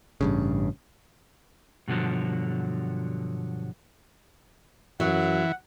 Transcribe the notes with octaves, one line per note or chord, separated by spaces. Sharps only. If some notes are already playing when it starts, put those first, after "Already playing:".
A1 G2 C#3
G2 B2 D3 F3 F#3
F#2 E3 F#3 F#5